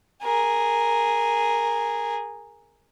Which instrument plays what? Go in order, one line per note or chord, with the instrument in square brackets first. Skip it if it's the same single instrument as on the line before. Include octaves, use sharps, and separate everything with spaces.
[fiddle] G#4 A#4